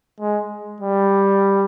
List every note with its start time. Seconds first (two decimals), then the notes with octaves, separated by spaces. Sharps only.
0.20 G#3
0.80 G3